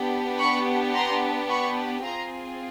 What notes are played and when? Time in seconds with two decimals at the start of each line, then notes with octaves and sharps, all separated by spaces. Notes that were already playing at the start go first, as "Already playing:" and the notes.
Already playing: B3 D4 G4
0.38 B5 C#6
0.94 A#5 C6
1.49 B5 C#6
2.03 C4 F4 G#4 A#5 C6